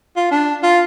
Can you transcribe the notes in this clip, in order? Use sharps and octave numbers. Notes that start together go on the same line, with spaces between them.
F4
D4
F4